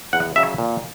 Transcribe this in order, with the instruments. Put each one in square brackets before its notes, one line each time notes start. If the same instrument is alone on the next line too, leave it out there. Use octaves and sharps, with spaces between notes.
[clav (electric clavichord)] E2 F#5
C#3 F#3 E5
A#2